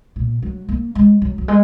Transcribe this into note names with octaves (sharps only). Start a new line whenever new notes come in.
A#2
F#3
A#3
G#3
F#3
F#3
G#3